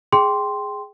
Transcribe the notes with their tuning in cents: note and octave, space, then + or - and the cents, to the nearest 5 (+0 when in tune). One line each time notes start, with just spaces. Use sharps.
G#4 +0 G5 +0 C6 +0